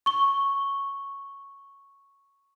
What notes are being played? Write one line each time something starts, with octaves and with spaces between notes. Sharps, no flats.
C#6 G7